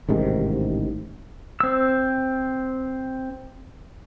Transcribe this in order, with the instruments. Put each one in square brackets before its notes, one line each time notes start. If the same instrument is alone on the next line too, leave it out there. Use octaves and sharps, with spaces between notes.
[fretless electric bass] A1 G#2 C3 D#3
[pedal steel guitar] C4 E6